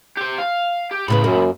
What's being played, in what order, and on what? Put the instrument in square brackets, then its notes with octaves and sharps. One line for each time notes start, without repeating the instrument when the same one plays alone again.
[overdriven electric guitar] G4 C5
F5
G4
[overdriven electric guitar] C#2 B5 [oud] A2 C#3 B3
[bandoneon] F#2 [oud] A#3